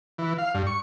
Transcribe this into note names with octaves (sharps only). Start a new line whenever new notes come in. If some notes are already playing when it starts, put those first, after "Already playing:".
E3
F5
G2
C#6